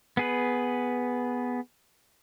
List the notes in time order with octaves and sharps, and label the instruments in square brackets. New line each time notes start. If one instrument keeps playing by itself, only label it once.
[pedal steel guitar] B3 G#4 B4